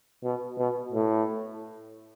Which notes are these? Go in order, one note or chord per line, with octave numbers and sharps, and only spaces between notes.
B2
B2
A2